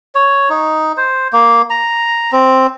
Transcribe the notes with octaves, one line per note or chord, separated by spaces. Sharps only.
C#5
D#4
C5
A#3
A#5
C4